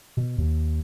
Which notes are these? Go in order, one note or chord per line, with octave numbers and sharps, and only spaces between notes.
B2
D#2